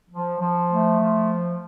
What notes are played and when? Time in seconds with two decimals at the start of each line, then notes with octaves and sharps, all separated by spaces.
0.10 F3
0.40 F3
0.71 A3
1.00 F3